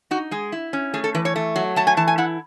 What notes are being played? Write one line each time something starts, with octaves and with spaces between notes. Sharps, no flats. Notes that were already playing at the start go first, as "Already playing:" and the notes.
D#4 F#4
G#3 G#4
E4
C#4
A3 G#4
A4
E3 B4
C#5
A3
F#3
A3 A5
G#5
E3 A5
G#5
E4 F#5